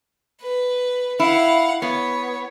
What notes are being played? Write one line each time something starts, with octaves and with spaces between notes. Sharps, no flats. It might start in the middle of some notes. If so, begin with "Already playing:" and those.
B4
E4 F5 F#5
B3 C#5